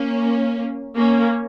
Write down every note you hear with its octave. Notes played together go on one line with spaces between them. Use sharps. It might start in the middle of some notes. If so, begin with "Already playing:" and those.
Already playing: A#3 C#4
A#3 C#4